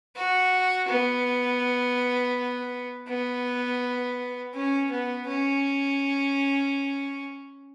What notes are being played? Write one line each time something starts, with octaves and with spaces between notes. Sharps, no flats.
F#4
B3
B3
C#4
B3
C#4